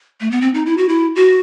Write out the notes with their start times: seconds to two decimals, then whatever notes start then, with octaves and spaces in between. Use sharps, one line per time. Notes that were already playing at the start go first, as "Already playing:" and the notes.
0.21 A3
0.31 B3
0.41 C4
0.54 D#4
0.66 E4
0.77 F#4
0.89 E4
1.16 F#4